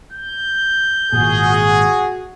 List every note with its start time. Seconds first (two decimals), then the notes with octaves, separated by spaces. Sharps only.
0.13 G6
1.13 G#1 A#2 F#4 G#4